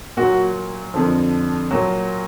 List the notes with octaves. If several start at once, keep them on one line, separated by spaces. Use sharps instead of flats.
A#2 F#3 F#4
F2 D3 F3
A#2 F#3